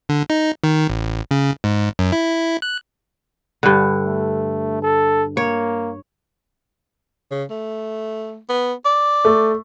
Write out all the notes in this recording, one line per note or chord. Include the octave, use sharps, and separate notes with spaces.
D3
D#4
D#3
A1
C#3
G#2
F#2
E4
F#6
G2 D3
A3
A4
A#3 C#5
C#3
A3
B3
D5
A3